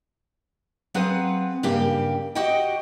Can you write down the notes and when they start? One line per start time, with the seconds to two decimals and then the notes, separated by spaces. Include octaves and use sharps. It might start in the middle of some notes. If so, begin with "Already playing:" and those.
0.94 F#3 C4 F4 G#4 B4 F#5
1.63 G2 C#3 A#3 G4
2.35 F#4 G4 D#5 F#5 G5